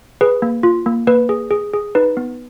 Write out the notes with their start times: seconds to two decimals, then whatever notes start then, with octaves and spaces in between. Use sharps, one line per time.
0.21 G#4 B4
0.42 A#3
0.63 F4
0.86 A#3
1.07 A#3 B4
1.29 G#4
1.51 G#4
1.74 G#4
1.95 D#4 B4
2.17 B3